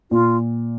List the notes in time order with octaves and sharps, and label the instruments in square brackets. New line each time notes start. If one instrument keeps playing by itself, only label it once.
[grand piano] A#2 [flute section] F4